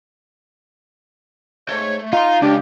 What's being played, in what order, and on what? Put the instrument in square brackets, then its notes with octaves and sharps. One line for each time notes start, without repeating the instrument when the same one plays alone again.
[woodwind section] G#2 C#5 [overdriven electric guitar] A3
[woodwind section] D#4 [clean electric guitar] F4 [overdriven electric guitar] F5 C6
[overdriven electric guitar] C#2 [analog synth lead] D4 [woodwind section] G4